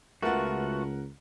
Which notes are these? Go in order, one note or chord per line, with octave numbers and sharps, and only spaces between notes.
C#2 A3 B3 F4 F#4 A#4 F#5